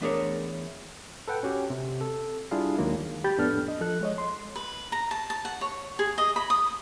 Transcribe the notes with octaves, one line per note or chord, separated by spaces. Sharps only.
E2 A3 D4 G#4 A#4 C#5
A4 B4 F#5 G5
C#4 F#4 G4
C3
A4
G3 D4 E4 F4 G#4 F5
D#2 D#3 F#3 G#3 A#3
G4 B5 G6 A6
F2 A2 B3 D4 A4 F6
D#5
F3 A4 F#6
G#3 C#5 D#5
C6
B4
A#5
A5
A5
F#5
C#5
G#4
D#5
B5
D#6